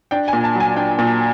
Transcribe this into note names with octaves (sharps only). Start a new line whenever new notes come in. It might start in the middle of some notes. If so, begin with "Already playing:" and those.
D4 G5
G#5
A#2
A5
F#3 G#5
D4 G5
A#2